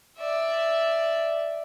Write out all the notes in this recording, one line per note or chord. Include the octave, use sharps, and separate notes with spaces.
D5 E5